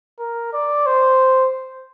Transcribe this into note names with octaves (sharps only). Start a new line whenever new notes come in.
A#4
D5
C5